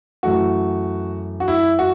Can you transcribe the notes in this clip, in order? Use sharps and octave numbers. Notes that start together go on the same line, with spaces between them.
F#2 E3 A3 F#4
F#4
E4
F#4